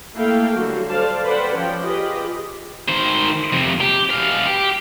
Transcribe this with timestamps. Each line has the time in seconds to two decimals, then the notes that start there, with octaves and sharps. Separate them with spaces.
0.15 A3 A#3 E4 A4 F5 G5
0.54 D3 F#3 G3 F#4
0.88 A4 C5 D5 F5 A5
1.24 A4 B4 C5 D5 F#5 G5
1.54 F3 C#4 F4 G5
1.83 F4 G4 G#4 B4 D#5
2.89 D#3 C5
3.53 F2 C3
3.81 G4
4.10 B2 F5
4.46 G4